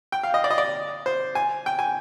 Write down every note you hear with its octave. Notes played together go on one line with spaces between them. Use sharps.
G5
F5
D#5
D5
D#5
D5
C5
G#5
G5
G#5